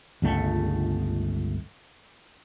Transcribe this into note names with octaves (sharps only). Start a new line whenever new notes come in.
G1 C#2 A3